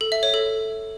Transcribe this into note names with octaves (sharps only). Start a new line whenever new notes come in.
A4
E5
C#5
A4